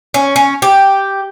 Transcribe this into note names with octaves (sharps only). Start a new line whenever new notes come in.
C#4
C#4
G4